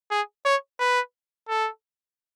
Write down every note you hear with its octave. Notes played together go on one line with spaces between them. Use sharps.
G#4
C#5
B4
A4